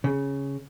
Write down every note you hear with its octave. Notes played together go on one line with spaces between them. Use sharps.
C#3